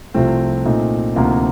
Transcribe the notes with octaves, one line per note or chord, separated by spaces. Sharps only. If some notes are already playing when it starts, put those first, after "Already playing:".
C2 C3 F3 A3 C4
A#2 A3 C4 D#4
D2 C3 F3 A#3 D#4